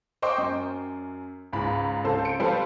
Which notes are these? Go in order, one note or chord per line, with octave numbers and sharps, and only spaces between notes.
C5 D#5 G5 C#6 D6
F#2
C#2 G#2 B5
C#2 C4 A4 C5
C#7 D7
F3 G3 C4 A4 B4 C5